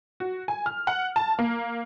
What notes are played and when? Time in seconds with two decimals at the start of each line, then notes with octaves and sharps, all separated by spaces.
0.20 F#4
0.48 G#5
0.66 F6
0.87 F#5
1.16 A5
1.39 A#3